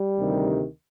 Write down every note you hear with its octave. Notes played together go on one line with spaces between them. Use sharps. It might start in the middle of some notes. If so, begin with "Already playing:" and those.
Already playing: G3
D2 C3 D#3